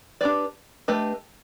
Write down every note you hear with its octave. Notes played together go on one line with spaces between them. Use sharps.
D4 G4 B4 D5
A3 D4 G4 B4 D#5